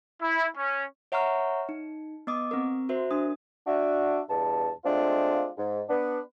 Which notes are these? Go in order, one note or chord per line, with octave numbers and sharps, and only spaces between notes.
E4
C#4
C#5 E5 F#5 A#5 C#6 F6
D#4
B3 D#5 D6 D#6
C4 A#4
F#4 A#4 C5 E5
D4 D#6
D4 F#4 E5
E2 G2 B2 A5
G#3 A3 C4 D4 F4
G#2
B3 D4 B4